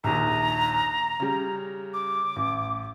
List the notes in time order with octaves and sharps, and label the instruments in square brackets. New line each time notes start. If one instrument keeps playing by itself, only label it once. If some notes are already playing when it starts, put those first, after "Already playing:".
[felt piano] A#1 D#2 [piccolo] A#5
[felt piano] C#3 G3
[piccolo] D6
[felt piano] A1